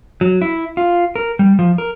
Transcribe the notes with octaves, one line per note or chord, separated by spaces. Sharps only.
F#3
E4
F4
A#4
G3
F3
A#4